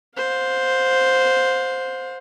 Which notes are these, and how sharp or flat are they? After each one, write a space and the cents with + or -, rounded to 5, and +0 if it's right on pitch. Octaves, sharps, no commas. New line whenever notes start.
C5 +0 F5 +40